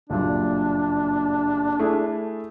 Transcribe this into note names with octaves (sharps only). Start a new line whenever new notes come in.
F#1 G2 A#2 D4
A3 E4 G#4